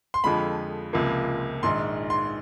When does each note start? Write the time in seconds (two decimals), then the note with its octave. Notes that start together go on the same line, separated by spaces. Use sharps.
0.14 C6
0.24 F2 D3 F3 G#3 B5
0.93 C#2 C3 F3 A#3
1.63 A#1 G#2 D#3 G#3 C6
2.10 C6